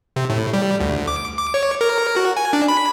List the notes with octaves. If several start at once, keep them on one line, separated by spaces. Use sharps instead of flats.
C3
A2
G3
D2
D6
D6
C#5
A#4
F#4
G#5
D4
B5